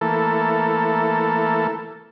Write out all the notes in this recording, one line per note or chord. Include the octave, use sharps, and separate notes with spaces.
E3 A3 A#3 A4